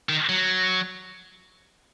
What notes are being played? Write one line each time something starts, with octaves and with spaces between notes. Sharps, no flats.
D#3
F#3